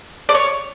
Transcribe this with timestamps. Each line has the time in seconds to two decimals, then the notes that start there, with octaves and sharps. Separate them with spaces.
0.29 D5
0.35 C#5